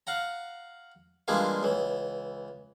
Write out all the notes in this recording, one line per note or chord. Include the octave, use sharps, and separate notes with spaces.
F5 F#5 A#5
E3 G3 G#3 A#3 D4 F4
C#2 E3